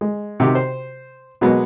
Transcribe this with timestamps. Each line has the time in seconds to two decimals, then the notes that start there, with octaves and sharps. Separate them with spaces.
0.01 G#3
0.40 C3 D#3 F#4 G4
0.55 C5
1.41 B2 F#3 G#3 A#3 B3